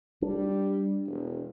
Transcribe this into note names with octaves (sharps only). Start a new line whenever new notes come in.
G3 D4
E1